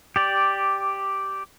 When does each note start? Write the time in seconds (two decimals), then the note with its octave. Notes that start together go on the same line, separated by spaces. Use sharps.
0.16 G4 D5